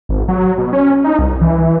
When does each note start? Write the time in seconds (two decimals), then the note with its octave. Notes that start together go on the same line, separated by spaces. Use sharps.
0.09 G#1
0.28 F#3
0.58 B2
0.73 C#4
1.04 D#4
1.19 C2
1.41 E3